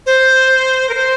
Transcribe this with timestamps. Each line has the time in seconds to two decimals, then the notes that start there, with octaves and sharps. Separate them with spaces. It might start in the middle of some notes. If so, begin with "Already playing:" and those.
0.06 C5
0.89 A#4
0.94 C5